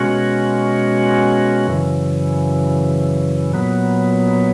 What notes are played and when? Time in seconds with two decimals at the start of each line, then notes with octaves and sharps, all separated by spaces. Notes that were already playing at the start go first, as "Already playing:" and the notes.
Already playing: B2 G#3 C#4 F#4
1.68 F#2 C#3 E3
3.52 A#2 F#3 B3